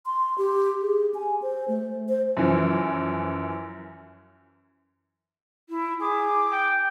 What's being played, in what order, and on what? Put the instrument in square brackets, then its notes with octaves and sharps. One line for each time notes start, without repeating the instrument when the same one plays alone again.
[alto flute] C6
G4
G#4
G#5
C5
A3
C5
[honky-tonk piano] F#2 E3 F3
[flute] E4
[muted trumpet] G#4 [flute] D6
[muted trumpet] G5